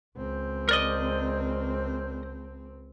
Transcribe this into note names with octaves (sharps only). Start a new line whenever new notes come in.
C#2 C4
A#4 D5 D#5